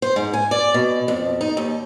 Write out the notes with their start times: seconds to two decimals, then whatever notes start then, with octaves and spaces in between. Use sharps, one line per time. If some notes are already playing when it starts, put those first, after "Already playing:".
0.02 C5
0.16 G#2
0.33 G#5
0.51 D5
0.74 B2
1.08 F2
1.41 D#4
1.57 D#2